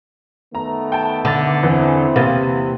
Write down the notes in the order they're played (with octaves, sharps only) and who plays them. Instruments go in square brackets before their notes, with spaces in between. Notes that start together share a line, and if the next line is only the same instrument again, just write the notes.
[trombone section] D#3 A3 B3 [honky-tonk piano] A#5
[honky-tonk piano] G5 A5
[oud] D3 [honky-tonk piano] D6 A6
[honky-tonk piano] E2 E3 [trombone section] C4 E4
[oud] E2 C3 A#3 [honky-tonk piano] B3 A6 D#7